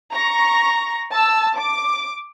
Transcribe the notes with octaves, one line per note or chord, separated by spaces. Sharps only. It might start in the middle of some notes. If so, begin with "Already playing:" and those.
A#5 C#6 A#6
A5 E6
D6